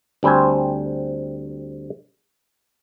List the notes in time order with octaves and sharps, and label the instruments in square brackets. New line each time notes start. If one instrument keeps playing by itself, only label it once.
[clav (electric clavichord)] D2 G3 C4 C5 G#5